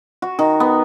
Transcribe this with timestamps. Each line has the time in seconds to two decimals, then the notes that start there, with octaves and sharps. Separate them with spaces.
0.22 F#4
0.39 D#3
0.60 B3